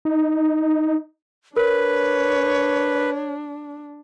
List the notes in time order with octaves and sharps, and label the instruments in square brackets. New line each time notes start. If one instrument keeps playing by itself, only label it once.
[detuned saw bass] D#4
[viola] D4 [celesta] A#4 [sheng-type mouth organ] B4 [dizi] C#5